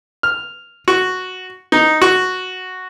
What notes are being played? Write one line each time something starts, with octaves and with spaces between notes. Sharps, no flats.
F6
F#4
D#4
F#4